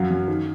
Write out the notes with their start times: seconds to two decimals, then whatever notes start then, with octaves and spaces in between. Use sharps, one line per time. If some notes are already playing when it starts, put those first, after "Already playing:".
Already playing: F#2 F#3 F5
0.11 F#2
0.28 D#3